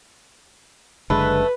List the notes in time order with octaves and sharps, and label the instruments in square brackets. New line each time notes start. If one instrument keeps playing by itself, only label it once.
[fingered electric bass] F#1 D3 G#3 [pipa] A3 [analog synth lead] B4